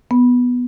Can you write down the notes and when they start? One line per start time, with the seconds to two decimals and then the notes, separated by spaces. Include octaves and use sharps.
0.11 B3